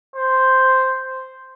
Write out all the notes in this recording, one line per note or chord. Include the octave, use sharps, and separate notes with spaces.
C5